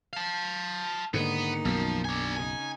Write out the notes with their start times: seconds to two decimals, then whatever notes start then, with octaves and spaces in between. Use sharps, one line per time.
0.13 F5 A5
1.14 G#2 D3 D#3 A#3 B3 D#4
1.65 B1 F#2 F3
2.05 D4 G#5
2.36 C#3 C#4 D#4 G#5